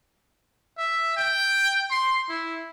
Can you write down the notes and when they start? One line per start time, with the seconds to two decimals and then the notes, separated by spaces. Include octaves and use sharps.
0.78 E5
1.17 G5
1.90 C6
2.29 E4